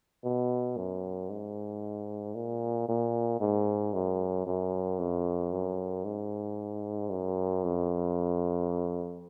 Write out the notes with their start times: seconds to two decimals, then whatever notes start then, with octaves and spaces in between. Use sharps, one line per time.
0.24 B2
0.77 F#2
1.29 G#2
2.35 A#2
2.89 A#2
3.41 G#2
3.94 F#2
4.47 F#2
4.99 F2
5.52 F#2
6.05 G#2
7.10 F#2
7.64 F2